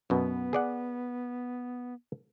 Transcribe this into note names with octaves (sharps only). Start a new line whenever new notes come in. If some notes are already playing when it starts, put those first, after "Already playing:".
F#2 B2 B3
G#4 D5 F#5